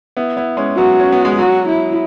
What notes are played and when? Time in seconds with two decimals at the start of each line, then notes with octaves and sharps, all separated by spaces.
0.17 B3 E4
0.37 B3 E4
0.57 G#3 C#4
0.77 F#3 B3 F#4
1.00 C#4
1.12 B3
1.25 G#3
1.39 F#3 F#4
1.68 E4